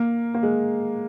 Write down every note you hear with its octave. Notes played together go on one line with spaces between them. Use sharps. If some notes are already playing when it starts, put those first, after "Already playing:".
Already playing: A#3
A#3
G#3